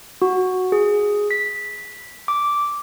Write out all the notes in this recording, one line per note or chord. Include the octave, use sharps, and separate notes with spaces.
F#4
G#4
B6
D6